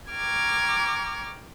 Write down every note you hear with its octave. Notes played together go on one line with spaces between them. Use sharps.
G5 A#5 C#6 D6 F6 G#6